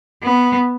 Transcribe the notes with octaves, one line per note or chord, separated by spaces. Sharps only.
B3